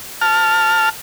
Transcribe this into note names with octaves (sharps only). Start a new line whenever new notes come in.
A5 F6